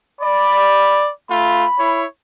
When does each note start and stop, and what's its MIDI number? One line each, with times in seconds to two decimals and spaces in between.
0.21 1.08 74
0.21 1.10 83
1.30 1.63 57
1.30 1.63 65
1.30 2.04 83
1.79 2.04 64
1.79 2.04 73